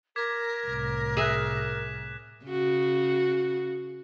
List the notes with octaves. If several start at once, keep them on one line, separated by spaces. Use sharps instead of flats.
A#4 D6 G#6 B6
C2 A2
G#4 E5 F#6 B6 E7
C#3 F#4